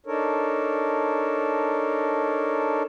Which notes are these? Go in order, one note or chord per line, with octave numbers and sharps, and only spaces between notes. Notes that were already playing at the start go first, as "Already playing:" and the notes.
D4 D#4 A4 A#4 C#5